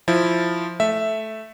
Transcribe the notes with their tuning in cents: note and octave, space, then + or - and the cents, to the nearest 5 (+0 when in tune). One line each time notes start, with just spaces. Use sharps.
F3 +0 E4 +0
A3 -10 E5 +0